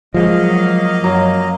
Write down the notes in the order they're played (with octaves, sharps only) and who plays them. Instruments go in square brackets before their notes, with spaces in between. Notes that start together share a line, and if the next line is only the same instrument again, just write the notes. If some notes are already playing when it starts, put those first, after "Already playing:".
[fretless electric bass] F3 G#3 [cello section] F#3 [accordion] A#3 D#5 F5
[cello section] F#2 [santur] F#3